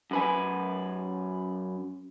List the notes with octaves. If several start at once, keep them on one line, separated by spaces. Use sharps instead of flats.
F#2 B4 G#5